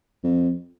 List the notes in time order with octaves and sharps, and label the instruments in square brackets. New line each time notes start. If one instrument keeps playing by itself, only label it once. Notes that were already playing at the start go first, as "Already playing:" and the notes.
[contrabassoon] F2